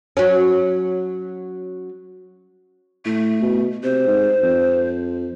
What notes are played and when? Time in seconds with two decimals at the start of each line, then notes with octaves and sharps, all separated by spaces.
0.17 F#3 C#4
3.05 A2 A3
3.42 B2
3.83 C3 C5
4.07 G#2
4.43 F2